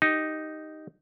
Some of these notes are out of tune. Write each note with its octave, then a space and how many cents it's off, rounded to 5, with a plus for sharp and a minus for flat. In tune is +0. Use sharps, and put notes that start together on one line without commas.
D#4 +0 G4 +0